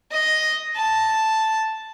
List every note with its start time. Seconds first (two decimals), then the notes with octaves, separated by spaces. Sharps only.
0.12 D#5
0.76 A5